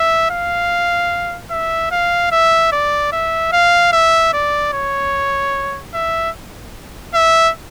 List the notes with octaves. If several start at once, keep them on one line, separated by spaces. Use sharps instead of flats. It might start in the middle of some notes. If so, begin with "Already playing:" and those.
Already playing: E5
F5
E5
F5
E5
D5
E5
F5
E5
D5
C#5
E5
E5